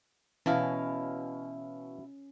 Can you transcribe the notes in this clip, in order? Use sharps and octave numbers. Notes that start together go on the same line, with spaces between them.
B2 E3 C#4 E4 F5 A5